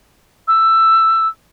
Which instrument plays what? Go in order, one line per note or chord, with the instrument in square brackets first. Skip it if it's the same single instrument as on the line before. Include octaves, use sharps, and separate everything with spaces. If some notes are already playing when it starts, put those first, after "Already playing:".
[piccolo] E6